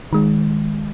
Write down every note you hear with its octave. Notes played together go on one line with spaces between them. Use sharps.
D#3 G#3